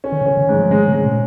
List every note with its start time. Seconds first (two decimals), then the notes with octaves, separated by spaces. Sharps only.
0.04 C#4
0.12 D#3
0.22 C#3 C#4
0.37 D#3
0.48 G#2
0.55 F3
0.70 D#3 G#3
0.88 C#3
0.93 G#3
1.04 A#2